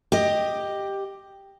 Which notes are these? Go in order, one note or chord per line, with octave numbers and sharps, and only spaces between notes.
G4 D#5